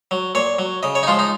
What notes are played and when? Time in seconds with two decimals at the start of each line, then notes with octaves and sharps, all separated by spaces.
0.11 F#3
0.35 A#2 C#5
0.59 F#3
0.83 C#3 D#5
0.95 C#5
1.03 D#4
1.07 F3 G#3 F4
1.19 D#4